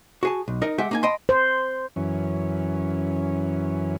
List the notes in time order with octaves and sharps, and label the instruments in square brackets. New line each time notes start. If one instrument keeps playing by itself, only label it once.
[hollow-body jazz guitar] F#4 G#4 A5
B1
D#4 A#4 D#5
G#3 G4 E5 F#5 G5
A#3 D#4 G#5
D#5 G5 A5 B5 C6
[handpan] C5
[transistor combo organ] F#2 E3 C#4